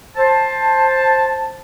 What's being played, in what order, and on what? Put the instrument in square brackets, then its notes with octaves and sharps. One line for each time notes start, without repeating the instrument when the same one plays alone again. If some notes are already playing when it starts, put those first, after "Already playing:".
[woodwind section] C5 A5